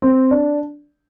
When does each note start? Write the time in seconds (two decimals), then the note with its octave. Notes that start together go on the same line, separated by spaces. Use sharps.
0.02 C4
0.31 D4